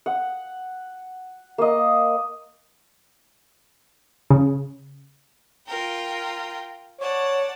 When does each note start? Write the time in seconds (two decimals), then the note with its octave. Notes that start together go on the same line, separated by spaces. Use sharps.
0.06 F#5
1.58 A#3 D#5
4.30 C#3
5.66 F4 A#4 G5
7.00 C#5 D5 F#5 A5